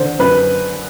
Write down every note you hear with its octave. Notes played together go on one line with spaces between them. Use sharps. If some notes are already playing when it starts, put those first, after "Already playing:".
Already playing: D3 C5
F#2 B4